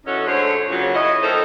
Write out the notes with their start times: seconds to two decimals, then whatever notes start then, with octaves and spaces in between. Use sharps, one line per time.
0.05 E3 C#4 D#4 F#4 A4 C#5
0.26 G#2 D3 A3 F#4 C5 C#5
0.69 A#2 C#3 F#3
0.95 C#4 E4 C#5 D#5
1.22 D#3 A3 D#4 A4 A#4 C5